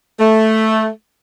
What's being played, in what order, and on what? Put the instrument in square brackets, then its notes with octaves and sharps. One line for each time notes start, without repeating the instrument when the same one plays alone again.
[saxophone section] A3